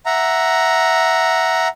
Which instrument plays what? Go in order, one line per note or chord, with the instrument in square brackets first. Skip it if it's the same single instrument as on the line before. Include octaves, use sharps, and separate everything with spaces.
[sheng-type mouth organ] E5 F#5 A#5